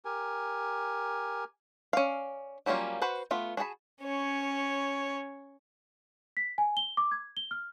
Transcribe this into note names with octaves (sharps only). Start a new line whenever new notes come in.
G4 A#4 G#5
C#4 D5 F5
F#3 G3 A#3 C#4 F4
F#4 B4 C5 F#5
A3 B3 F4
D4 F#4 G#4 A5 B5
C#4 C#5
B6
G#5
G7
D6
G#6
G7
F6